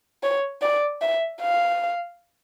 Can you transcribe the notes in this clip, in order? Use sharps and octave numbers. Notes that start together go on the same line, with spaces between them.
C#5
D5
E5
F5